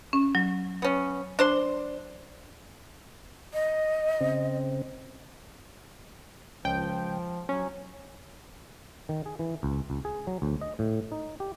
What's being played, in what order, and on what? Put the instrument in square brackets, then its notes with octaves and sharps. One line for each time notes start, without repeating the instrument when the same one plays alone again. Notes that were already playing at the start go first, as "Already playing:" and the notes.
[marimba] C#4
F#3
[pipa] B3 C#4
D4 C5 C6
[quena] D#5
[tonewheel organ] C#3 C4
[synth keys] C#2 G5 [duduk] F3
[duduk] F#3 [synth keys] C#4
[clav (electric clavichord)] D#3
G#4
E3
C#2
C#2
G#4
F#3
D2
D#5
A2
D#4
G4